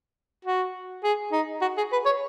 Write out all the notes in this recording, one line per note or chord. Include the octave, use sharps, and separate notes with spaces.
F#4
G#4
D#4
F#4
G#4
B4
C#5